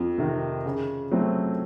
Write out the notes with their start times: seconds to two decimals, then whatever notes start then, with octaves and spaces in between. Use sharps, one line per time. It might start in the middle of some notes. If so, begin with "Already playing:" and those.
Already playing: F2
0.18 C3 D#3
0.65 C#3
1.11 F#3 A3 C4